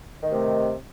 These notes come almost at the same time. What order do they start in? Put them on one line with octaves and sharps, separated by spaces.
D#3 A3 C3